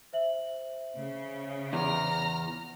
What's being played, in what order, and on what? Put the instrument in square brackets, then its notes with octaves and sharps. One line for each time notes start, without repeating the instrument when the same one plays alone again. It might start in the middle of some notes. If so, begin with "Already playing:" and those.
[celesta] C5 E5 F#7
[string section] C#3
[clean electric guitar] E2 [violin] A#5 F6